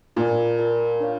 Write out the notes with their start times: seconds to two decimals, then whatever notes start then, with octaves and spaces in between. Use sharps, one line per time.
0.16 A#2 F4 A#4 D5 A5
0.59 F4 A#4 D5 A5
1.00 D4 F4 C#5 F5